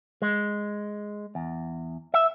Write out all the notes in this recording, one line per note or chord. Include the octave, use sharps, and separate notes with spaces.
G#3
E2
E5